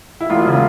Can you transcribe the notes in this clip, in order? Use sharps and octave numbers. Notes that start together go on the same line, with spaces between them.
E4
E1 F4
C#3